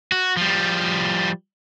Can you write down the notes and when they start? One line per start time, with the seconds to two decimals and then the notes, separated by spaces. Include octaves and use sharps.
0.12 F#4
0.37 F3 G3